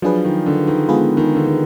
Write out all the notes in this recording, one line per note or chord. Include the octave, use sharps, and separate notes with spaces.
F3 F#3 D4 G#4 B4
D#3
D3
D#3
G#3 B3 F4 G#4 B4
D#3
D3
D#3